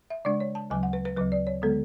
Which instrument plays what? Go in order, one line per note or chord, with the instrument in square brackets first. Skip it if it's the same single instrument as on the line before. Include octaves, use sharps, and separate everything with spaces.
[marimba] E5
C#3 G#3 D4 D5
C#5
A5
D2 C#3 F#3 G#5
F#5
B4
B4
D2 C#3 F#3 B4
D5
C#5
D3 G#3 B3 A4